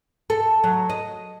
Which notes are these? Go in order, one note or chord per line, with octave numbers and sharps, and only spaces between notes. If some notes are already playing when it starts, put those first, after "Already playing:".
A4
F#3
D#5